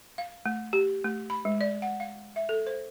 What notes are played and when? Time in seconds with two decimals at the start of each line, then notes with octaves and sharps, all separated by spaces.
0.18 F5
0.46 A3
0.73 G4
1.05 A3
1.30 B5
1.45 G#3
1.61 D5
1.82 F#5
2.00 F5
2.36 E5
2.49 A4
2.67 C5